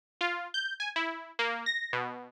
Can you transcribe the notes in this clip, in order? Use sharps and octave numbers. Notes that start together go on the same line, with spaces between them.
F4
G6
G#5
E4
A#3
A#6
B2